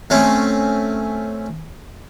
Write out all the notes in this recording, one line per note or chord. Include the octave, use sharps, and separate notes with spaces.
A3 C4 C#4